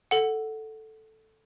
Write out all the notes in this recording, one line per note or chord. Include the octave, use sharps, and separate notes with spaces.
A4 F#5